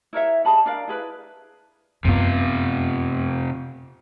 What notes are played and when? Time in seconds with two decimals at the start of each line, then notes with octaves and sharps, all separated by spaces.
0.13 E4 A#4 C#5 E5
0.45 G#4 D#5 A5 B5
0.65 D4 A#4 D5 F5
0.88 E4 G#4 B4
2.05 F#2 C3 B3 F4